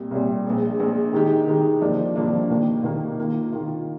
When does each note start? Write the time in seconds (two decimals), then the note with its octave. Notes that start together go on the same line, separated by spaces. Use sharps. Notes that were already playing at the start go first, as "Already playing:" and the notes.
Already playing: C2 A#2 G3
0.11 C2 A#2 G3
0.45 A#1 A#2 G#3
0.80 A#1 A#2 G#3
1.13 D#3 G#3 D#4 G4
1.47 D#3 G#3 D#4 G4
1.81 G2 F3 A#3 D4
2.16 G2 F3 A#3 D4
2.50 D#2 D#3 A#3
2.83 D#2 D#3 A#3
3.18 D#3 A#3 F4
3.52 D#3 A#3 F4